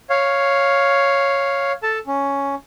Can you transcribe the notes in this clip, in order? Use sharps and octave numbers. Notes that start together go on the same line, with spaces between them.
C#5 F5
A4 A5
C#4